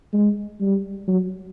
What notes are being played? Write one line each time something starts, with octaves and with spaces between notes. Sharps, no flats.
G#3
G3
F#3